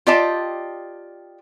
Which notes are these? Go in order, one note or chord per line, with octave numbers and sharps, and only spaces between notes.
F4 G4 D5 D#5 G5 A5